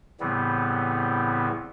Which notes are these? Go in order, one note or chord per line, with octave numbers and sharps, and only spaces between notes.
A2 C#3 E3 G3 B3 C4